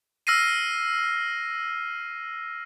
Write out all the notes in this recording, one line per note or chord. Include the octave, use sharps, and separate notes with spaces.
E6 F6 A#6 C7 D#7